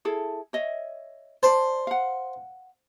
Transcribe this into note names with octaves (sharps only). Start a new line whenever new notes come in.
E4 G#4 A4
C#5 D#5 E5
C5 D5 A5
F5 F#5